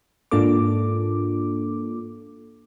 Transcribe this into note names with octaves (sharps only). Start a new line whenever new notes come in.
G#2 A#3 D4 F4 A4 D6